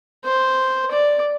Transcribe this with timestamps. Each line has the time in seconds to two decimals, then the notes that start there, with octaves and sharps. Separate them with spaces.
0.25 C5
0.91 D5